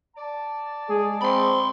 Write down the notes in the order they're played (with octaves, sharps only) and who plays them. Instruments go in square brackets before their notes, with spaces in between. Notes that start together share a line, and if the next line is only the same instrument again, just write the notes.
[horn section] D5 A5
[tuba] G#3 [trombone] G#4
[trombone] C4 [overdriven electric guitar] B5 C6